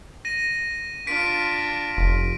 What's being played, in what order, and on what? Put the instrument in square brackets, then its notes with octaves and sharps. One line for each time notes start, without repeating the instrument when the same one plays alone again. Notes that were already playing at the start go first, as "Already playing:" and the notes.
[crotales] A#6 D#7
[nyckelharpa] D4 F4 [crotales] B6 D7
[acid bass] F1